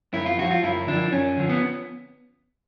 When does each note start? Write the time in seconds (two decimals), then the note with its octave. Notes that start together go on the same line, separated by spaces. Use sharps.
0.13 F#2 E4
0.26 F4
0.38 D3 F3 F#4
0.51 F4
0.64 F#2 E4
0.87 D3 F3 D4
1.12 F#2 C#4
1.37 D3 F3
1.49 B3